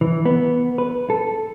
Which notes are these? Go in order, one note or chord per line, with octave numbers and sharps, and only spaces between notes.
E3
B3
B4
A4